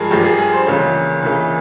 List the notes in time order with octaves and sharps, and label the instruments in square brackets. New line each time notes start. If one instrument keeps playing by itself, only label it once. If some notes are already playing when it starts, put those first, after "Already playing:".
Already playing: [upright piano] G2 F3 G#3 G#4 A#4
G2 F3 G#3 G4
G#4
G#4
C5
C#2 C#3 E3 A#3 C#5
C#2 C#3 E3 A#3